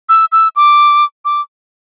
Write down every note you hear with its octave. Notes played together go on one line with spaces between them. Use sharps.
E6
E6
D6
D6